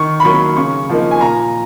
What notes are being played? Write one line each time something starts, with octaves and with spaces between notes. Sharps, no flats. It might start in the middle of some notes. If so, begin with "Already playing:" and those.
Already playing: D#3 C#6
B5
F#3 A#3 C#6
C#3 C#6
F3 A#3 D#4
G#5
A#2 A#5